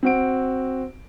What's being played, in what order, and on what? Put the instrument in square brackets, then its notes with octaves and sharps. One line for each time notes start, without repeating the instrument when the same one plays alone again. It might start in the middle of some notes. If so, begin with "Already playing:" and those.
[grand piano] C4 F#4 D7